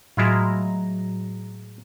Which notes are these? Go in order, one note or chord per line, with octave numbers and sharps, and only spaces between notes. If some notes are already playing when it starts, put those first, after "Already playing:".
A2 F#3 G#3 E4 F4 A#5